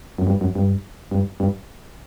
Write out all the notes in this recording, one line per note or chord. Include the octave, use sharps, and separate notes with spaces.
F#2
G2
F#2
G2
G2
G2